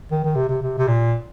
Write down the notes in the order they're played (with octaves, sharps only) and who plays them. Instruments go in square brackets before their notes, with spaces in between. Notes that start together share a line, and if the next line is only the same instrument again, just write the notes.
[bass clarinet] D#3
D#3
C3
C3
C3
C3
A#2